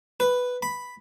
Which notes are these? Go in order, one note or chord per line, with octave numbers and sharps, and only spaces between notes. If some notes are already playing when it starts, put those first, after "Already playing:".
B4
B5